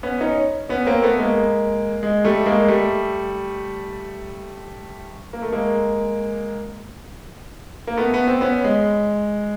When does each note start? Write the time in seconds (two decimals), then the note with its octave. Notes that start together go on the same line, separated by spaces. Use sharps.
0.03 B3 C#4
0.21 C#4 D#4
0.69 B3 C#4
0.86 A#3 C4
1.02 A3 B3
1.19 G#3 A#3
2.03 G#3
2.24 G3 A3
2.46 G#3 A#3
2.68 G3 A3
5.33 A#3
5.42 A3
5.52 G#3 A#3
7.87 A#3
7.97 A3 B3
8.14 B3
8.27 C4
8.41 B3 C#4
8.64 G#3